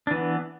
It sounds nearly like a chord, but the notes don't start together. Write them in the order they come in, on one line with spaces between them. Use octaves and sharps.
D4 E3 B3